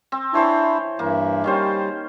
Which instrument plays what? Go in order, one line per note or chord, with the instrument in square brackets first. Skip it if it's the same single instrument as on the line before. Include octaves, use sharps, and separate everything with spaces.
[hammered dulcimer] C4
[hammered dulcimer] E3 C5 C#5 [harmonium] D4 E4
[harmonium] G2 E3 [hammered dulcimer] A#3
[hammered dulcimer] D#3 C#4 C5 [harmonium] G3